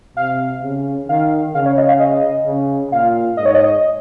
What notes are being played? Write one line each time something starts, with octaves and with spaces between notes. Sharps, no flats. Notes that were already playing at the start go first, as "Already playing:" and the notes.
C3 F5
C#3
D#3 F5
C#3 F5
C#5
D#5
F5
D#5
C#3
A#2 F5
G#2 D#5
C#5
D#5